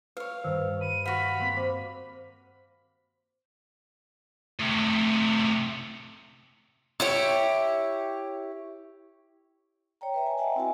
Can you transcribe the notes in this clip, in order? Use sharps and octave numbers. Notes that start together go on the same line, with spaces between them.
B4 C#5 F5
G2 D#3 C5 E6
B5 C#7 D#7 E7
F#4 F5 F#5 B5 C#6 E7
A#3 C4
C5 D6
A2 C3
E4 G4 C#5
C#5 D5 G5 A#5
B4 E5 A#5
G#5
D#5 E5 F#5 G5 A5 A#5
C4 E4 F#4 G#5